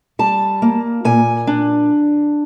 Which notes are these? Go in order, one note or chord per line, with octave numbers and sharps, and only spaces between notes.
G3 A5
A#3
A#2 G#5
D4